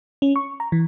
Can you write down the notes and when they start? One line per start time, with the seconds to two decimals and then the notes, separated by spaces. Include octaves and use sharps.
0.22 C#4
0.36 C#6
0.60 A#5
0.72 E3